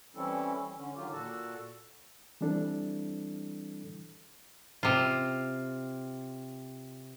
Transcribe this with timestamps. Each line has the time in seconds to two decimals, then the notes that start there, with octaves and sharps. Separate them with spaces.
0.15 E3 G3 C4 C#4 E4 A4
0.76 D3 C#4
0.96 D3 D#3 F#3 F4 G4
1.13 A#2 F#4 A4 A5
2.41 E3 G3 C4 D4 E4 A4
4.83 C3 F4